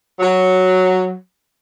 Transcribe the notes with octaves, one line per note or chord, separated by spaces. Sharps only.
F#3